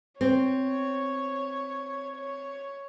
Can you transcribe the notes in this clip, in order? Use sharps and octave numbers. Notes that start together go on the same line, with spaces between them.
C4 C#5
C#5